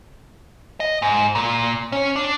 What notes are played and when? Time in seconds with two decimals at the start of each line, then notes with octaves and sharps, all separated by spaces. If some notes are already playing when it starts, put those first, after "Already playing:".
0.80 D#5
1.02 G#2
1.35 A#2
1.92 C#4
2.16 D4